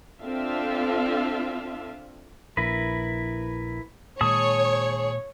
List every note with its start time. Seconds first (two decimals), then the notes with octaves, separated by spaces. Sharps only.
0.23 C4 D4 F4 A4 E5 F5
2.57 A#1 E4 A#4 B4
4.21 A#2 D#3 G#3 G#4 C#5 A5 D#6